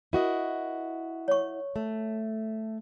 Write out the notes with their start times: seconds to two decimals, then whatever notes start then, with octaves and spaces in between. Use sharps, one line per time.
0.13 E4 F#4 A#4 D#5
1.28 C#5 C#6
1.76 A3